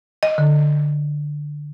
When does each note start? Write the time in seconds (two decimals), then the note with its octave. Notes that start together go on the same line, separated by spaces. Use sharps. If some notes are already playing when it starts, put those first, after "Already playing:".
0.23 D#5
0.38 D3